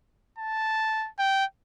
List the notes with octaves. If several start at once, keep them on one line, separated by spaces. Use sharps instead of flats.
A5
G5